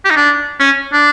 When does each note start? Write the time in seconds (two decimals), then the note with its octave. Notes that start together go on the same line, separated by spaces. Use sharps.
0.05 G4
0.10 D#4
0.16 D4
0.60 C#4
0.93 D4